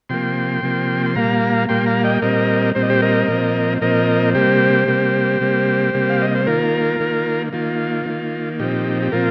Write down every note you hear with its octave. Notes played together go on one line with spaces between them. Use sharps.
C3 F3 A#3 G5 C6
C3 F3 A#3
C6
A#2 G3 A#3 F5 A#5
A#2 G3 A#3 G5 C6
F5 A#5
D#5 G5
A#2 G3 C4 A#4 D#5
A#2 G3 C4 C5
D#5
G4 C5
A#4 D#5
A#2 F3 C4
A#2 F3 C4 A#4 D#5
C3 G3 A#3 G4 C5
C3 G3 A#3
C3 G3 A#3
C3 G3 A#3
F5
D#5
C5
D#3 A#3 F4 A#4
D#3 A#3
D#3 A#3 F4
D#3 A#3
A#2 F3 C4 D#4 G4
G4
A#2 F3 C4 F4 A#4